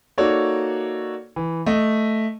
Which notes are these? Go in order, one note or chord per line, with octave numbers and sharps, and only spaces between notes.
A#3 D#4 F#4 A4 C#5 D5
E3
A3 D#5